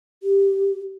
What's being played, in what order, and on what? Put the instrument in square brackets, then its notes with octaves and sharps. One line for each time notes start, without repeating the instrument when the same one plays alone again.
[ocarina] G4